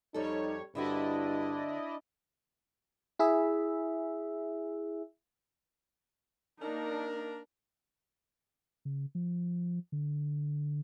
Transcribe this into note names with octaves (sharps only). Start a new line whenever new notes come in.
F2 G3 D#4 A4 C#5
G2 D3 C4 D4 E4 F#4 D5 D#5
E4 G#4 E5
A#3 D4 D#4 A#4
C#3
F3
D3